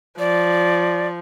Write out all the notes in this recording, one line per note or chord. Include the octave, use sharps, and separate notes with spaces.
F3 D5